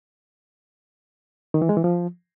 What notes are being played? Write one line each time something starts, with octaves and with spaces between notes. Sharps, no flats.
D#3
E3
G#3
E3
F3